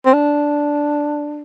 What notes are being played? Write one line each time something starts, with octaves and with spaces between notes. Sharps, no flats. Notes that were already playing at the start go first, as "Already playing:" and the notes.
C4
D4